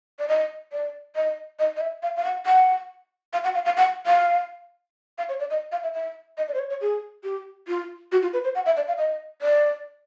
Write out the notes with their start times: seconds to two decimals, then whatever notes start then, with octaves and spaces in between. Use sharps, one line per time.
0.19 D5
0.28 D#5
0.72 D5
1.16 D#5
1.59 D#5
1.76 D#5
1.81 E5
2.03 F5
2.16 F5
2.25 F#5
2.46 F#5
3.33 F5
3.44 F#5
3.55 F5
3.65 F5
3.77 F#5
4.06 F5
5.18 F5
5.29 C#5
5.40 D5
5.50 D#5
5.72 F5
5.83 E5
5.94 E5
6.37 D#5
6.48 D5
6.54 C5
6.59 C#5
6.70 C#5
6.81 G#4
7.24 G4
7.68 F4
8.12 F#4
8.23 F4
8.33 B4
8.44 C5
8.55 F#5
8.66 E5
8.77 D5
8.88 F5
8.98 D#5
9.42 D5